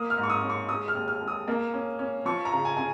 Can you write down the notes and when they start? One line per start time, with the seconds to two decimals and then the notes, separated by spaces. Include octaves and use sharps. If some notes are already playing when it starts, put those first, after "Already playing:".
Already playing: A#3 D#6
0.10 F6
0.17 G#2
0.23 C#6
0.30 D#6
0.43 C#4
0.50 C#6
0.69 G#3 D#6
0.88 F6
0.95 D#2
1.08 F6
1.22 G#3
1.28 D#6
1.48 A#3
1.73 C#4
1.99 C#4
2.25 F3 C#6
2.45 A#5
2.52 C#3
2.65 G#5
2.77 C#3 G#5